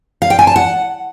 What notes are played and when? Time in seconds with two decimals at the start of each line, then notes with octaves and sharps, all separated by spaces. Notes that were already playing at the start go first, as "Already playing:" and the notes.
0.22 F5
0.30 G5
0.39 G#5
0.47 A5
0.56 F#5